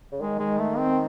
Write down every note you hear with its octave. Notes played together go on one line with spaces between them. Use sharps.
C#3
D#3 G#3
G#3
A3
C4